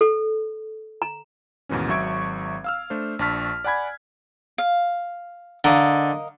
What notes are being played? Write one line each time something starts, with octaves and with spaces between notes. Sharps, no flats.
A4
A#5
D#2 G#2 B2 E3 C#4
G#1 F#3 E5 C#6 G#6 D7
F5 E6 F6
A3 D4 C5
A#1 D4 A5 C#6 F6 B6
D5 F#5 G#5 B5 G#6
F5
D3 A#4 D#5 F5